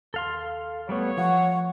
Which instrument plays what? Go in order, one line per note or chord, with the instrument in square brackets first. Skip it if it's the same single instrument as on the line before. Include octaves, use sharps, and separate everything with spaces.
[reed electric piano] D#2 [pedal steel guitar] A4 F5 C6
[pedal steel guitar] G3 A3 B3 [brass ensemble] C#5
[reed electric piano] F3 F5 [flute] F#5 [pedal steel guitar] C#6